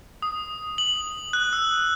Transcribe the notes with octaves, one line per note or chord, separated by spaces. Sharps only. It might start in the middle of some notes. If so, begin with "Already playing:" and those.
D#6
F#7
F#6
E6